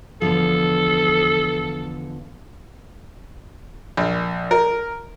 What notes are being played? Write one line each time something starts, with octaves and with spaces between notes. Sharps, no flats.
E2 D3 F3 A4
A#1
A#4